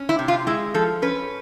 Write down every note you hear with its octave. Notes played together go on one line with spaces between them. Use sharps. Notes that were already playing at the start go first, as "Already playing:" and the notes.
Already playing: C#4
E4
C3
F4
G#3 E4
F3 A4
C#4 B4